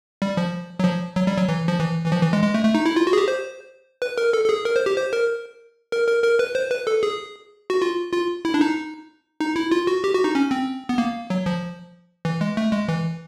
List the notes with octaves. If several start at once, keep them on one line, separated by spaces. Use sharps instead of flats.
G3
F3
F#3
F3
F#3
G3
F#3
E3
F3
E3
E3
F3
E3
G#3
G#3
A3
A3
D#4
E4
F4
F#4
G#4
G4
C5
B4
A#4
A4
A4
G#4
A#4
C5
G4
C5
A#4
A#4
A#4
A#4
B4
C5
B4
A4
G#4
F#4
F4
F4
E4
D4
D#4
D#4
E4
F4
F#4
G4
F#4
D#4
C#4
C4
B3
A#3
F#3
F3
E3
G#3
A3
G#3
E3